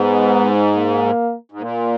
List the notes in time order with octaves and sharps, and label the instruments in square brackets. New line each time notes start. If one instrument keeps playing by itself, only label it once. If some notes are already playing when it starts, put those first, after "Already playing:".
Already playing: [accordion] G#2 [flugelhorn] B3
[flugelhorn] A#3
[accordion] G#2
[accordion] A#2 [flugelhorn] A#3